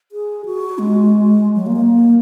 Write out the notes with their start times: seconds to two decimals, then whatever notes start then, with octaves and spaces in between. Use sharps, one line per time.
0.12 G#4
0.45 F#4
0.78 G#3
1.55 F#3
1.66 A#3
1.76 A#3